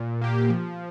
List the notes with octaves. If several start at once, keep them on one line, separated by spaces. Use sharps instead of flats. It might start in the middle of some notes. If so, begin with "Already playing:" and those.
Already playing: A#2
A#3 G4
F3